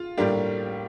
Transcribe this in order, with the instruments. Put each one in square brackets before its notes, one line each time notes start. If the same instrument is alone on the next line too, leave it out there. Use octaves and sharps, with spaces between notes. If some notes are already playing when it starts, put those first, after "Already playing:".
Already playing: [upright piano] F4
A2 G3 A#3 D4 G4